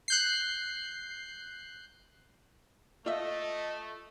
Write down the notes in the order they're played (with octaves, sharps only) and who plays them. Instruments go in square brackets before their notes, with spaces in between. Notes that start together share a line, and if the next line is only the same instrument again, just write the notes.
[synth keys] F#6 G6 C7
[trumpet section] A3 [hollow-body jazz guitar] F4 E5 [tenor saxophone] D#5